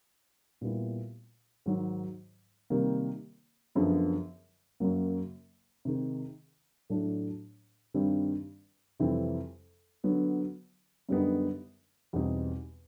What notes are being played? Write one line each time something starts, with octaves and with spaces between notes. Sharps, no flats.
A#2 G3 B3 E4
G#2 D#3 F#3
C3 D#3 G3 A#3
F#2 D3 F3 G#3 B3
F#2 C#3 F#3 A#3
C3 D#3 G#3
A2 F#3 A3 D4
G2 D#3 G3 C4
F2 C3 E3 G3 C4
D3 F#3 B3
F#2 D3 G3 B3 D#4
E2 B2 G3 C4 D#4